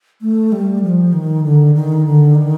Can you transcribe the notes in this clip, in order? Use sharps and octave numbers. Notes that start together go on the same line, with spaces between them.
A3
G3
F3
D#3
D3
D#3
D3
D#3